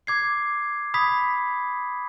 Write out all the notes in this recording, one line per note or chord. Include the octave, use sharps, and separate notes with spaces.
D6 G#6 C7
B5 D#6 G#6 B6